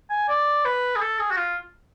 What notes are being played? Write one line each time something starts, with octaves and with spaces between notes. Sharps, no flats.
G#5
D5
B4
G#4
A4
G#4
F#4
F4